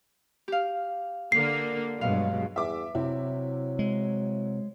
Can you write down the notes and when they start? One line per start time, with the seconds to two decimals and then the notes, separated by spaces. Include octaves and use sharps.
0.48 G4 F5
1.32 D3 A#3 C7
2.01 G2 B2 F#3 G#3 F5
2.56 E2 E5 D6
2.95 C3 F#3 E4
3.79 G#3